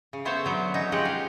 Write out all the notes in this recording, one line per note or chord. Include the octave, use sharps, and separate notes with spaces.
C#3
A3 B3 C5 C#5 E5
D3 F#3 B3
C#4 D#4
F3 G#3 G4 F#5
F5